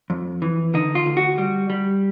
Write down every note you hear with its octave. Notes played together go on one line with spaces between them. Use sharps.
F2
E3
D3 D#4
F4
D2
F#4
G3
G3